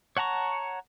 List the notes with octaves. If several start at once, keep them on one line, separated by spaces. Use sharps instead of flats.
C#5 F#5 A5 A#5 C#6